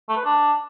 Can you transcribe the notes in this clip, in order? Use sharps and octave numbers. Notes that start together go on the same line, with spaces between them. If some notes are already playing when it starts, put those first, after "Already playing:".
A3
B4
D4